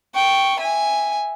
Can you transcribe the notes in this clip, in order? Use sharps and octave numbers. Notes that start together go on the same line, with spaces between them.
G5 C#6
E5 G#5